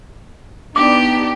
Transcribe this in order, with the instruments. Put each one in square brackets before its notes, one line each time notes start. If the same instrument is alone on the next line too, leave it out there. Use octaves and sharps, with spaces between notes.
[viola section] B3 D4 D#4 [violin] G4 [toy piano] D6